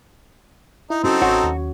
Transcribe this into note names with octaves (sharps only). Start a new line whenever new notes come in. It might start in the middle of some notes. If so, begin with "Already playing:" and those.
D#4 E4
C4 C#4 D#4 F#4 A4
A1 F#4 C#5 A#5 C6
D#2